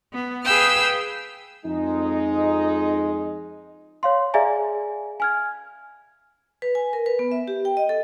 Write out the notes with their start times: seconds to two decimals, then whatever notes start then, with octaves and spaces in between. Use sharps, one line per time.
0.12 B3
0.43 G#4 B4 F5 G5 E6 F6
1.66 F2 G#3 D#4
4.03 C#5 F5 C6
4.34 G#4 D5 E5 F5 G#5 A#5
5.20 G#5 F6 G#6
6.62 B4
6.75 G#5
6.93 A#4
7.06 B4
7.19 B3
7.31 E5
7.48 G4
7.65 G5
7.77 D#5
7.89 A4